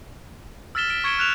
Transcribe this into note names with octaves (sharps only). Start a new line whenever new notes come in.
E6 F6 A6 B6 E7 G7
B6 D7 E7
C#6 G#6 C#7 D7 E7 G7
F6 F#6 E7 F7